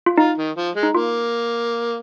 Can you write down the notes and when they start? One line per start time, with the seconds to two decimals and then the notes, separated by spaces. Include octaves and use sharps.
0.06 F4
0.18 D#4 F4
0.37 D#3
0.56 F3
0.75 G#3
0.83 D#4
0.94 A#3 F4